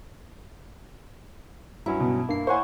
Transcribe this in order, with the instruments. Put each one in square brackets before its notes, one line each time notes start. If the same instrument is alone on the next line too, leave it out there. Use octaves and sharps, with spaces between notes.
[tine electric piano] G2 F#3 C#4 [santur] E4
[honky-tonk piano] B2
[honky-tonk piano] G2 [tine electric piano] A#3 C7
[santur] E4 F#5 C#6 [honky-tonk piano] C5 C#5 G#5